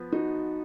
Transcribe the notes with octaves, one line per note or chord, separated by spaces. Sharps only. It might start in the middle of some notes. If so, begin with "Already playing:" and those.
Already playing: F3 B3
D#4 F#4